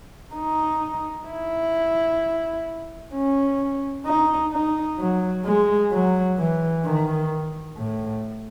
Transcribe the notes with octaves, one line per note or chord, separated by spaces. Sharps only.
D#4
E4
C#4
D#4
D#4
F#3
G#3
F#3
E3
D#3
A2